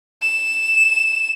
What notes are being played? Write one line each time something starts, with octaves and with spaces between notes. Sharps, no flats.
E7